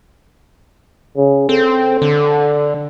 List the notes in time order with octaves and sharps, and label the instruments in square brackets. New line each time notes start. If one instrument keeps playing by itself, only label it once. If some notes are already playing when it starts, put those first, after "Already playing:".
[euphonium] C#3
[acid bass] C4 [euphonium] A4
[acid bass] D3